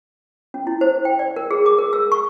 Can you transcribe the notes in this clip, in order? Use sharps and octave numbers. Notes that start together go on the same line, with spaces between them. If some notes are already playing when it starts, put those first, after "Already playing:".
C#4
E4
C5
G5
D5
A#4
G#4
D6
A#4
E6
C#6